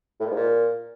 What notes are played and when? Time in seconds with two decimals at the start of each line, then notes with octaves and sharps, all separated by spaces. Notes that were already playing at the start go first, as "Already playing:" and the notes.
0.20 A2
0.25 A#2
0.31 G#2
0.36 A#2